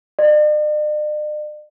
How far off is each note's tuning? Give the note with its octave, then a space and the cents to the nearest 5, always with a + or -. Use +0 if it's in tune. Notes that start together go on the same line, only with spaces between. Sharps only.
D5 +45